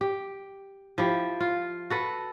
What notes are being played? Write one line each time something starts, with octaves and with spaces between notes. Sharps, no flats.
G4
F3 E4 G4
F4
F#4 A4 B4